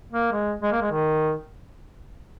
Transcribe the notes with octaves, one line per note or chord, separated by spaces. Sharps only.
A#3
G#3
G#3
A#3
G#3
D#3